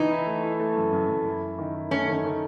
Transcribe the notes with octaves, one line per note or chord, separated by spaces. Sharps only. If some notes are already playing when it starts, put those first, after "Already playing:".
Already playing: E3 D#4
E4
A3
E4
A3
F#2
F#2
F#2
E4
E4
D#3
E4
A3 C#4
D#3
D#3